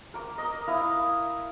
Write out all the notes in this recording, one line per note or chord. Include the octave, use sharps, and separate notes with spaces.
A#4 D6
A#4 D#5
E4 F5 D#6